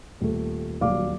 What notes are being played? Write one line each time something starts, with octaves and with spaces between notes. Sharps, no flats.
D#1 A3
D#1 D2 F#3 D5 F5 D6